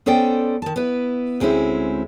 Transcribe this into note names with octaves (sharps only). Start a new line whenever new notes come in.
B3 C#4 A4 C5 D5 G5
D#3 A5
B3 E4 B4
D2 G#3 C4 C#4 E4